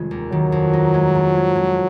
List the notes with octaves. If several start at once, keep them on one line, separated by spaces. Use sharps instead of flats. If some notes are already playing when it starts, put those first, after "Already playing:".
Already playing: F1 D#3 G#3
D#2
D#3 F#3
F2
D#4
G#3
F2
G#3
F2